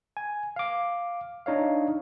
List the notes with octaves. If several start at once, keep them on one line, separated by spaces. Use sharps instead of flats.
G#5
F5 D6
D4 D#4 C#5 F5